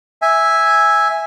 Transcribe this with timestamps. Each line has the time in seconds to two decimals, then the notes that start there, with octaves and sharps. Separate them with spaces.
0.22 E5 G#5